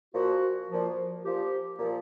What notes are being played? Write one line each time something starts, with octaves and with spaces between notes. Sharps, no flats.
A#2 F3 F#4
A#2 F3
A#2 F3 G4
A#2 F3